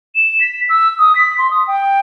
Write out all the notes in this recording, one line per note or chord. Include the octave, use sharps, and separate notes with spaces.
E7
B6
E6
D#6
B6
C6
D#6
G5